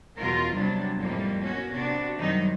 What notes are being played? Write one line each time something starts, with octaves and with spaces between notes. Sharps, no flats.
E2 B2 C#4 F4 A#4
C3 F#3 G3 B3 D4
F2 A2 F3 G3 A#3 B3
A#3 B3 C#4 F#4
C3 B3 D4 F#4
F#2 C3 D#3 F#3 G3 D#4